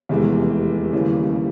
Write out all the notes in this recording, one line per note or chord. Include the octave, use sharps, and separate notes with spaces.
F1 E2 C3 E3 G#3
D#2 C#3 E3 G3